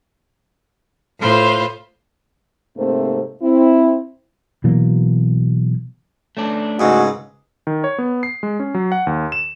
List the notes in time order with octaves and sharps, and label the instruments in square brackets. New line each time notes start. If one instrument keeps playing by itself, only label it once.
[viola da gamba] A2 F4 [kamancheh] B4 C5
[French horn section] G#2 C3 A3 A#3 C4 C5
C4 E4
[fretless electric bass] B2 E3 F#3 A#3
[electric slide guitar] A3 C#4 D4
[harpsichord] C#2 G#2 [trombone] F#4 [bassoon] G#4
[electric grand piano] D#3
C#5
B3
C7
G#3
C#4
F#3
F#5
D#2
E7